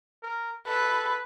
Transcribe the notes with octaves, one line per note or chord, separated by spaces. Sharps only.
A#4
A4 B4